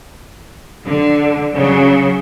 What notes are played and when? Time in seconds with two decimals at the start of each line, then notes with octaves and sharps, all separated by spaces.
0.87 D3
1.56 C#3 F#3